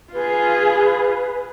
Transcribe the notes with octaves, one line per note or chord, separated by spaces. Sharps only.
F4 G#4 B4